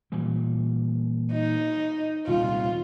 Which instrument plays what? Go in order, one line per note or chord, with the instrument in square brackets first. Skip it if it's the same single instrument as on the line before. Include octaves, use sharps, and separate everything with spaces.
[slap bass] A#2 E3 G3
[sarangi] D#4
[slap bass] D#1 C2 [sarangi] F4